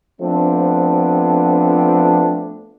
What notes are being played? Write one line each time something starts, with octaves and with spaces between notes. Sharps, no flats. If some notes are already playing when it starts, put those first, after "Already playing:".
F3 A3 B3 C4 D4